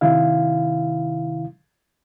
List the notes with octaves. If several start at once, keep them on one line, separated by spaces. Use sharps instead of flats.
C3 D#3 E4 F5